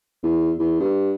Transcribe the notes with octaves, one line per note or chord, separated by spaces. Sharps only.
E2
E2
G2